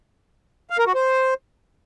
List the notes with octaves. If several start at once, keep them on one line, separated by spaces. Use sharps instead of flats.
F5
A#4
F#4
C5